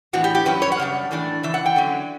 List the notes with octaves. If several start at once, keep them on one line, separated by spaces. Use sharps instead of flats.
A2 E3 B3 D4 F#4
G4
G4
G2 F#3 C#4 E4 B4
C#5
F#5
F#2 C#3 G3 D4
A2 E3 A3 D4
C#3 E3 E5
F#5
G5
D3 F#3 C#4